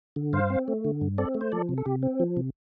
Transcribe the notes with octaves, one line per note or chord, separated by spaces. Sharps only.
D3
G2 C5 F5
C4
A3
D3
G2
C4 A4 D5
A3
C5
F3 A4 D5
C3
A4
C3 G4
C4
F3
C3